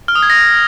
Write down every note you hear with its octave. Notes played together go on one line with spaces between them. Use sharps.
F6
D#6
G#6
A#6